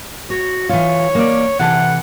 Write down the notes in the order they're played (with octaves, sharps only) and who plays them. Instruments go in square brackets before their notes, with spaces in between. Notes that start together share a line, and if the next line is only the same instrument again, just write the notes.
[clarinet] F#4 [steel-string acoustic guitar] C#5
[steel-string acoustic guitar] E3 F4 [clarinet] C#5
[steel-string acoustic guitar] A#3 D5
[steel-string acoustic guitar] C3 E3 A4 [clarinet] F#5